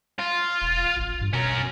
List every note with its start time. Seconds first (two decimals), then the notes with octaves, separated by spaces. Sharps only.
0.19 F4
0.62 E1
0.97 A1
1.21 G2
1.33 B2 C#4 A#4